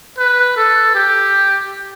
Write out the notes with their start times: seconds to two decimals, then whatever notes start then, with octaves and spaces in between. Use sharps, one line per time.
0.19 B4
0.57 A4
0.95 G4